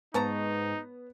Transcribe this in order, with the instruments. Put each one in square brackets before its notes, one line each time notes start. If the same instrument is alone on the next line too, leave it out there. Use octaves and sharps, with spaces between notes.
[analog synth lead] G#2 [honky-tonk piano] B3 [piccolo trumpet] D#4 [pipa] C#5 A5 A#5